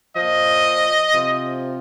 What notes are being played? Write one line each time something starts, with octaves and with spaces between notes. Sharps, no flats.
A#2 F3 D#5
C3 F3